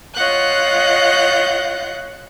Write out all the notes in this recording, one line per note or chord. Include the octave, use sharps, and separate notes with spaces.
F4 C#5 D#5 F#5 F#6 G6